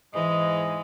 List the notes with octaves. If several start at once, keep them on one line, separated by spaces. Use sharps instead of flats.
G#2 E3 G#3 D#5